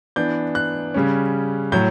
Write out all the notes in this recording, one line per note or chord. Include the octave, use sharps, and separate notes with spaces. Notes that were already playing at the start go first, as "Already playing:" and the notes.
E3 B3 D4 G6
F#6
C#3 G3 C#4
A2 F#3 G6